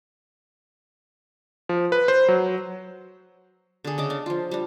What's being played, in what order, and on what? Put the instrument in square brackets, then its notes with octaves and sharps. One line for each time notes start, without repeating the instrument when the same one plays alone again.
[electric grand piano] F3
B4
C5
F#3
[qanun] D3 G#4
C#3 D#5 D6
D4
F3 F4
G3 D4